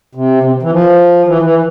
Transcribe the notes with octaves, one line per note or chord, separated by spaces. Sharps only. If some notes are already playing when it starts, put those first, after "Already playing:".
C3
C3
E3
F3
E3
E3